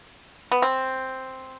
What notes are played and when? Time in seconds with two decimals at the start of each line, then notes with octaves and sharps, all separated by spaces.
0.52 B3
0.62 C4